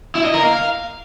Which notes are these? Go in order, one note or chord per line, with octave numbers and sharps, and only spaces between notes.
E4
D#5
A#4
F5